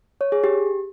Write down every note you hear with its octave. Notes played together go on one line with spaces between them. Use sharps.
C#5
G#4
G4